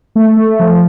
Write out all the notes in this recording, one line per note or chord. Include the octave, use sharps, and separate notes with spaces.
A3
A3
F3